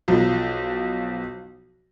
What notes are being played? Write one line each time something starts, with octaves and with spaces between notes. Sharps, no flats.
B1 F3